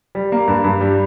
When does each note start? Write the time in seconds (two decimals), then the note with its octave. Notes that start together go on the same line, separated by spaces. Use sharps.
0.15 G3
0.32 A#3
0.48 G2
0.64 G2
0.81 G3